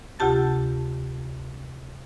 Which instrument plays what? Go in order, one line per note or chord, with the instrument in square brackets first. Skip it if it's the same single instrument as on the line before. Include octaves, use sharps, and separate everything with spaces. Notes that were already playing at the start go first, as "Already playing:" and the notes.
[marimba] D2 C3 F4 G4 A5 A6